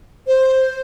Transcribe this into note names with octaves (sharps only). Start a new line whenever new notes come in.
C5